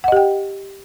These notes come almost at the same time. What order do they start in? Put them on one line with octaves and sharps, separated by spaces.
F#5 D#5 G4 G5